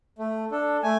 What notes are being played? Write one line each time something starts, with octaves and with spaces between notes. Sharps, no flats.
A3
D4 A4
A3 G#5